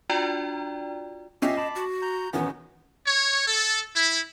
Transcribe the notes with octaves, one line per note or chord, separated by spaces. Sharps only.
D4 F4 F#4 D5 G5 A#5
A#2 C#4 G4 D#5 E5 C7
A5 B5 D6 E7
F#4
A#5 G6
E2 B2 D#3 B3 C#4
C#5
A4
E4